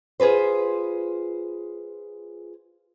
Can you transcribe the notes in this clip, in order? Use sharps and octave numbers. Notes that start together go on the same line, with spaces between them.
F4 G#4 A4 B4 C5